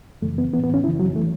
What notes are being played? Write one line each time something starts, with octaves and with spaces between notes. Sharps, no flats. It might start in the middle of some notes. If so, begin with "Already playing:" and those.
F#2 C#3 E3 A3
B3
A2 E3 B3
B3
C#4
F#2 C#3 E3 E4
F#3
E3 A3